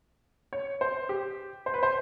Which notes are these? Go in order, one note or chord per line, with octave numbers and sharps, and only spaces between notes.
C#5
C5
G4
C5
B4
C5